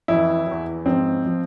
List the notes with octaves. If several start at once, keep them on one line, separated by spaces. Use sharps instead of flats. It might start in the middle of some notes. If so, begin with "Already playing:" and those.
F2 E3 E4
E2 E3
G#2 F3 C4
F3